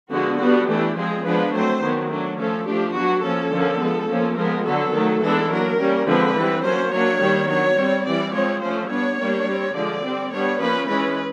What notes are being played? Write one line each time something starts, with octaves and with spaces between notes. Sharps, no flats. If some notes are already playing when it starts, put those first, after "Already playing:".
D3 F3 G#3 B3 F#4
G3 B3 D4 F#4
E3 A3 D4 G4
F3 G#3 C4 G#4
F3 G#3 B3 D4 B4
F#3 A3 C4 C5
D#3 F#3 B3 D4
F#3 A3 D4
F3 A3 C#4 A4
F3 A3 D4 G4
F#3 B3 D4 F#4
F3 A#3 C#4 A4
D3 F3 A#3 C#4
F3 G#3 B3
F3 A#3 C#4
F3 G#3 B3 A#4
D3 F#3 B3 A4
D#3 F#3 A3
E3 G#3 B3 D4 A4
F#3 A#3 D4 A#4
G3 A#3 C#4
D3 F3 G#3 C4 B4
E3 G3 C4
F#3 A#3 C#4 C5
F#3 A#3 D4 C#5
D#3 G3 A#3
F#3 B3 D4 C#5
G3 C4
E3 G3 C4 D5
F3 G#3 C4 C#5
F3 A3 C#4 C5
G3 B3 D4 C#5
G3 A#3 D4
G3 C4
D3 F3 G#3 D5
G3 C4
G3 B3 D4 C#5
F3 A#3 C#4 B4
E3 G#3 C#4 B4